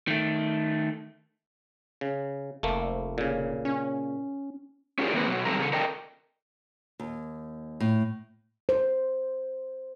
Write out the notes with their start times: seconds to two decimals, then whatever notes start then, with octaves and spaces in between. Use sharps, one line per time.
0.07 D#3 A3
2.01 C#3
2.63 F1 A3 A#3
3.18 A#2 C#3
3.65 C#4
4.98 C#4 F4 G4 G#4 A#4 D5
5.13 D#3 G#3 A#3 C4 B4
5.28 B2 F#3
5.45 D3 D#3 G3 C4 A4 A#5
5.58 C#3 G#4 A4
5.73 A4 A#4 D5 D#5 G5 A5
6.99 D#2
7.80 A2
8.69 C5